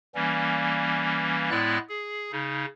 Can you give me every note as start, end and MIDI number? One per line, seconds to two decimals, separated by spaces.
0.15 1.50 52
0.15 1.50 55
0.15 1.50 58
0.15 1.50 61
1.51 1.78 45
1.51 1.78 56
1.51 1.78 59
1.51 1.78 64
1.51 1.78 74
1.51 1.78 90
1.89 2.32 68
2.32 2.66 49
2.32 2.66 63